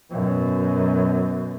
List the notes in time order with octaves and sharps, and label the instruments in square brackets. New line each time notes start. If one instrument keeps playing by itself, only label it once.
[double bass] F#2 B2